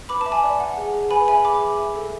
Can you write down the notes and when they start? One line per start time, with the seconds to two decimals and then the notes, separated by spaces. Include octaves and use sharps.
0.09 B4 B5 D6
0.21 A5
0.26 E5
0.32 G#5
0.43 D5
0.60 F#5
0.78 G#4
0.94 G#4
1.11 B4 G#5 B5
1.28 E5 G#5 B5
1.44 G#4 B5 D6
1.61 G#4
1.79 E5
1.95 A4